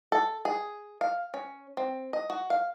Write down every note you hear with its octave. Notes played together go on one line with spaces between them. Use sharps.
A4
G#4
F5
C#4
C4
D#5
F#4
F5